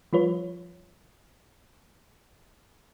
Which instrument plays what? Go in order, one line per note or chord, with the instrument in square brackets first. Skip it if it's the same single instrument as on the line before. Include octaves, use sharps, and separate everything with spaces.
[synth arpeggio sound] F3 G3 F4 B4 C#5